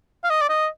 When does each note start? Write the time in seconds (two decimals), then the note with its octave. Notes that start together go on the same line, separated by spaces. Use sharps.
0.24 F5
0.30 D#5
0.42 D5
0.49 D#5